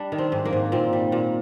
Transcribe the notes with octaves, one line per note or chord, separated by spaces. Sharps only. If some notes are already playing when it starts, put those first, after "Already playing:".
Already playing: G3 D4
D#3
C4
G#2
A#3
G#2
A#2 C4
G3
A#2